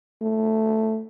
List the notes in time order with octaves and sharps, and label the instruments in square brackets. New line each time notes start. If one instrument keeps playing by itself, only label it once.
[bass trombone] A3